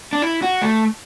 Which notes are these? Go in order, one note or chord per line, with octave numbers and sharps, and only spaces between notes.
D4
E4
F#4
A3